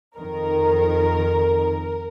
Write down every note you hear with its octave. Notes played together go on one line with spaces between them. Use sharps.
F2 D#3 A#4